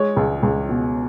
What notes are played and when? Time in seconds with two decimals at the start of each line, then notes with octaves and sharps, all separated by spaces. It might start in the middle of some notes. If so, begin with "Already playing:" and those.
Already playing: G#3 C#5
0.17 C#2
0.43 C#2
0.69 B2